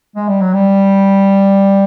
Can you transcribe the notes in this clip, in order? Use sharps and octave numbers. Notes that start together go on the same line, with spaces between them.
G#3
G3
F#3
G3